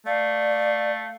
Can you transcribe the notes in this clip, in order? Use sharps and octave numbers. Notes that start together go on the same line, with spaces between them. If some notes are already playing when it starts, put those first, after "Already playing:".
A3 D5 F5